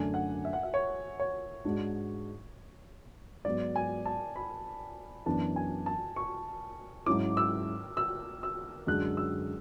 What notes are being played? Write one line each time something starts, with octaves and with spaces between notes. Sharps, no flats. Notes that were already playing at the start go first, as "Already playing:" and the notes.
Already playing: F#2 D3 A3 D4 G#5
F#5
E5
F#5
E5
C#5
C#5
G#2 G#3 D4 F#4
G#2 F#3 B3 F#4 D5
G#5
A5
B5
F#2 E3 B3 D4 A5
G#5
A5
C#6
G#2 F#3 C#4 E4 D6
E6
E6
E6
F#2 D3 G#3 D4 F#4 F#6
E6